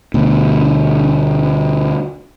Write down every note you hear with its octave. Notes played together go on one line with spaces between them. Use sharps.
D2 B2